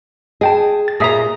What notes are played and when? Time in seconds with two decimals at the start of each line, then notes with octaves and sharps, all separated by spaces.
0.41 G#4 D#5 G5 A5
0.88 A6
1.00 A#2 G#3 E5 A#5 D#6 A#6